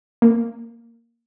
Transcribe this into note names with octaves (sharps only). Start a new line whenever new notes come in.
A#3